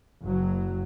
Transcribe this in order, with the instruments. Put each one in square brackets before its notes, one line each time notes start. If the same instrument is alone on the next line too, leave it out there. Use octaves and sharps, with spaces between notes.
[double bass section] F#1 F#3